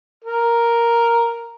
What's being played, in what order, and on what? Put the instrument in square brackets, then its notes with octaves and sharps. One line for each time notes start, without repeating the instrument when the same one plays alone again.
[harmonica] A#4